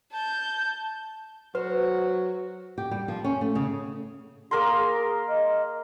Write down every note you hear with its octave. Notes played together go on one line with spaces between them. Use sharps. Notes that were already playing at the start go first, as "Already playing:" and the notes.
A5 G6
F#3 F#4 B4 C5
G4
G3
F3
C#4
A3
C#3
A#3 G#4 A#4 C6
D#5